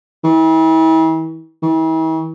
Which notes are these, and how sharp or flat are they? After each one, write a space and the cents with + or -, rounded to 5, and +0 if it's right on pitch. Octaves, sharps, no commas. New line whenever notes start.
E3 -40
E3 -45